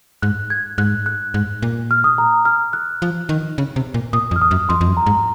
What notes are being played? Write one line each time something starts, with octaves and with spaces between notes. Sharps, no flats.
G#2 F#6
G#6
G#2 F#6
F#6
G#2
A#2
F6
D#6
A#5
F6
F#6
F3
D#3
C#3
C3
A#2
A#2 D#6
F2
F6
D#6
F#2
F2 C6
F2
F#2
A#5
G#2